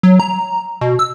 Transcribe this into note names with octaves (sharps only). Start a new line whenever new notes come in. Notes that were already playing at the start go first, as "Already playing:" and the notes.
F#3
A#5
B2
E6